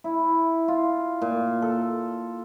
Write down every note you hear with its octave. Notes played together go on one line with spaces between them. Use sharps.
E4
F4
A#2
A4